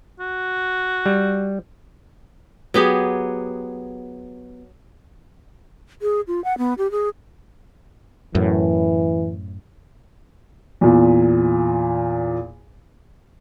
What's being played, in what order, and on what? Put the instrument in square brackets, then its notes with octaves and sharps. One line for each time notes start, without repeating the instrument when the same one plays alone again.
[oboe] F#4
[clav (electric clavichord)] G3
[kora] F#3 B3 G4 G#4
[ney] G#4
F4
F#5
B3
G4
G#4
[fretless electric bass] F#2 A2 [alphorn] E3
[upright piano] E2 A#2